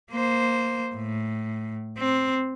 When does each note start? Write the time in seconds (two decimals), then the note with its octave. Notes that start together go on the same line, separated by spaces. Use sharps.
0.11 A#3 C5
0.95 A2
1.98 C4